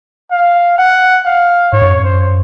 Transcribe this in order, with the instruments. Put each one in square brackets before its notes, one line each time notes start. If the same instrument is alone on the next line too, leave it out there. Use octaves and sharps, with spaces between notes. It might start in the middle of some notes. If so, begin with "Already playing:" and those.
[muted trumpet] F5
F#5
F5
[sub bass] G#2 [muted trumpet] C#5
[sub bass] F#2
F2
[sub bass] F#2 [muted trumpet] C5